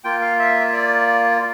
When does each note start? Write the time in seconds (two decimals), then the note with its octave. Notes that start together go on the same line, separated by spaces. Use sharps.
0.04 A#3 F4 G5
0.22 F5
0.39 E5
0.73 D5